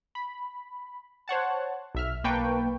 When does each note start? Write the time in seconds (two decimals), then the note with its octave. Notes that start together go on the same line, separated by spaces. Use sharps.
0.15 B5
1.28 C5 C#5 F#5 A5
1.95 B1 E5 F6
2.24 B1 A#3 B4 G5 A5 C#6